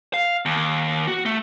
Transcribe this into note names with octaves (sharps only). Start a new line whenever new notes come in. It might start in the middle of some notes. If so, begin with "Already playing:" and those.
F5
D#2
F#4
A3